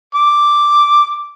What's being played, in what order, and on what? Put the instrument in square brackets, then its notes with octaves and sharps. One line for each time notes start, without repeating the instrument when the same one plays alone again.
[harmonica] D6